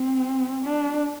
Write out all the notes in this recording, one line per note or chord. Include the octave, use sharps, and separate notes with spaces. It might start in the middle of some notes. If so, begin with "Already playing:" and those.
Already playing: C4
D4